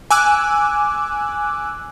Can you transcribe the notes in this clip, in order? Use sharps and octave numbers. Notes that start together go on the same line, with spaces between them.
G#5 D6 E6 F#6